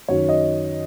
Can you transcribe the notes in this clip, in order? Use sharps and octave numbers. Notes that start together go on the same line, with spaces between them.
F#2 D#3 F#3 C#5
D#5